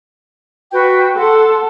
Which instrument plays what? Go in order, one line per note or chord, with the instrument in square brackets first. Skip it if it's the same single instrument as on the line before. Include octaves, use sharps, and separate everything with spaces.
[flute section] F#4 B4 G5
[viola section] A4 [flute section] F#5 C6